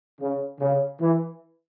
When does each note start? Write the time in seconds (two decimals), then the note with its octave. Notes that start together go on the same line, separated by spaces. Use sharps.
0.21 C#3
0.60 C#3
1.00 E3